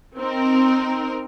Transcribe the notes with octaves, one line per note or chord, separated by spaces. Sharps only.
C4 D#4 A#4